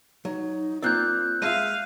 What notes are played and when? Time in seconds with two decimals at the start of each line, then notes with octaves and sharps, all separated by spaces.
0.25 F#3 D#4
0.82 A#3 C4 F4 D5 E6 F#6 G6
1.42 G#3 E5 F5 D#7